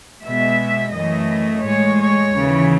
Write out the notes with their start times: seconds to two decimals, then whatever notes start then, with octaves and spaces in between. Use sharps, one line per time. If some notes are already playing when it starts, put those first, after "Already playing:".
0.25 B2 G#3 E5
0.94 F#2 E3 A3 D#5
1.64 A2 G#3 C#5
1.99 C#5
2.34 D#2 C#3 E3